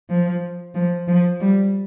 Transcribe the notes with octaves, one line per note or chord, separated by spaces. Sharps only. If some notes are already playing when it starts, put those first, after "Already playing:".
F3
F3
F3
G3